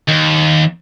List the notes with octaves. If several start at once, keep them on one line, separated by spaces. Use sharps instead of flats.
D#2